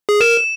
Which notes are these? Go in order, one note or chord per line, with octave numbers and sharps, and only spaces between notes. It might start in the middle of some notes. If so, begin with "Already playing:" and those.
G#4
A#4 E7